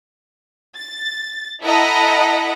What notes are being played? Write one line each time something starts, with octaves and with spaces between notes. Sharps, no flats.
A6
E4 A4 D#5 F#5 A#5 B5